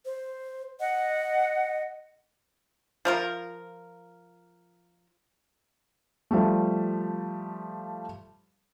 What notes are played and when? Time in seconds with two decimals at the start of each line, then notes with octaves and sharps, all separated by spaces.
0.05 C5
0.80 D#5 F#5
3.05 F3 F4 A#4
6.31 F3 G3 A3